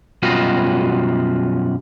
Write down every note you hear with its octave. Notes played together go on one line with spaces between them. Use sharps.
F#2 B2 G3 F4 F#4 D#5